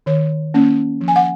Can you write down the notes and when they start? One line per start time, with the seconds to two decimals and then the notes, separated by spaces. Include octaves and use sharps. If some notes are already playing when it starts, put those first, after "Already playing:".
0.06 D#3 C#5
0.54 A#3 C#4
1.01 F3
1.08 G#5
1.16 F#5